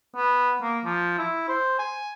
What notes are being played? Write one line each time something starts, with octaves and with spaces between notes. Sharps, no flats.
B3
A#3
F3
E4
C5
G#5